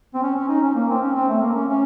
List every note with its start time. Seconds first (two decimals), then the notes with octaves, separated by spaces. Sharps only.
0.14 C4
0.23 C#4
0.36 C#4
0.49 D#4
0.63 C#4
0.75 A#3
0.89 C4
1.02 C#4
1.15 C4
1.28 A3
1.42 A#3
1.55 C#4
1.68 C#4